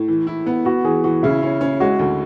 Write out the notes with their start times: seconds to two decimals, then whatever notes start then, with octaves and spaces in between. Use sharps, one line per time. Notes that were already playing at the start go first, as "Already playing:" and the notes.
Already playing: A2
0.08 E3
0.27 E4
0.46 B3
0.65 B3 F#4
0.84 E3 G#4
1.04 E3 F#4
1.23 C#3 E4
1.43 C#4
1.61 C#4
1.80 G#3 F#4
1.99 D2